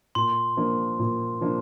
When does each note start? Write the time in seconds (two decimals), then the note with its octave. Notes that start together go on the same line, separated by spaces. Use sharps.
0.15 A#2 C6
0.57 F3 A#3 D4
0.99 A#2
1.41 F3 A#3 D4